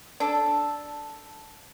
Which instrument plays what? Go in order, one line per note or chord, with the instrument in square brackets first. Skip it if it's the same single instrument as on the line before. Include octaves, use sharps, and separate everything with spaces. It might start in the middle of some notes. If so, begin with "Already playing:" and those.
[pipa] D4 A4